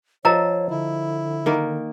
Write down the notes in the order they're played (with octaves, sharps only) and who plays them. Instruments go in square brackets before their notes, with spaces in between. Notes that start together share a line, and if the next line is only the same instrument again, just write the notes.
[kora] F3 [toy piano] A#4 D#5 A#5 [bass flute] C#5
[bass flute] D3 [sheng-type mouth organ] E4
[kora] D#3 A#3